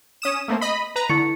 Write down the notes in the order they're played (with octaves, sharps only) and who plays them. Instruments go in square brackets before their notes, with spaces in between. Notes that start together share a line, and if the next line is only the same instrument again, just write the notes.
[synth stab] C#4 D#6 E7
A3 A#3 C4
D#5 B5
B4 A#5
[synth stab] D3 [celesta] E4 C#6 C#7